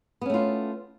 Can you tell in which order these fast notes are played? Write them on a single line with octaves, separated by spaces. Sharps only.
B3 C#4 A3 F4